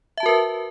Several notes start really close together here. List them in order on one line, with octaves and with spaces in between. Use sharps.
E5 A5 F#4 A#4 B4